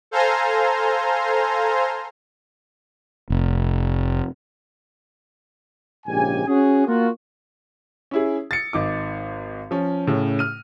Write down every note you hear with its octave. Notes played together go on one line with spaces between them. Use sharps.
A4 C5 F5 G#5 A#5 C6
F1
A#1 G#2 C#3 G4 G#5
C#4 F#4 G#4
A#3 F4 F#4
C#4 E4 G#4
A6 C#7
G#1 D#4 D6
F3 C#4
A2 C#3 C#4
F6 D#7